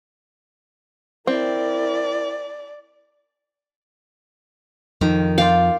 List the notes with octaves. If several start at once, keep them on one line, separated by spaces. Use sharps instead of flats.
C4 E4 A#4 D5
F2 D#3 F3
F4 D5 F5 G5